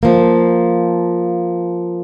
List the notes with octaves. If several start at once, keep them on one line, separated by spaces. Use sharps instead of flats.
F3 A#3